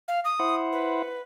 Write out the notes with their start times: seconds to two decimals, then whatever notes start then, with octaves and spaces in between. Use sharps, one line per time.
0.08 F5
0.25 D#6
0.40 E4 C5 F#5
0.72 B4